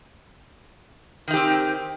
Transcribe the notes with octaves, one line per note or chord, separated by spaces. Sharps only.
D#3 C4 D#4 G4